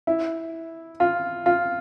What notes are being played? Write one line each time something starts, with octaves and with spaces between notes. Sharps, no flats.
E4
F4
F4